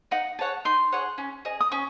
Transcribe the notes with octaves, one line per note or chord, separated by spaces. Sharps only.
D#4 F#5
G#4 C#5 F#5 A5
D#4 C6
G#4 C#5 F#5
C#4
G#4 D#5
D#6
C#4 C#6